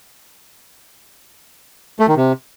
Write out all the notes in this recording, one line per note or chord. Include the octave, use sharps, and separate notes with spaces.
A3
D#3
C3